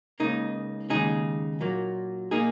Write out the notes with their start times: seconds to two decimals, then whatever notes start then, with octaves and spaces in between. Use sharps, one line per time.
0.20 C#2 C#3 A#3 D#4
0.90 D#2 C#3 G#3 D#4 G#4
1.61 A#2 F#3 A#3
2.31 A#2 A#3 D#4 G#4